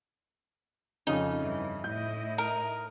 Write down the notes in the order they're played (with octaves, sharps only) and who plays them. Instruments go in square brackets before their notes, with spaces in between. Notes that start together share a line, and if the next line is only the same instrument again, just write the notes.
[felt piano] F2 C#3 C#4 [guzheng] D#4
[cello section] G2 E3
[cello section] A2 E4 D#5 [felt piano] G6
[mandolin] A#4